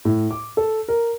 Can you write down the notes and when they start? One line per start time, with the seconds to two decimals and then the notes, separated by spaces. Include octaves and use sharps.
0.05 A2
0.31 D6
0.57 A4
0.88 A#4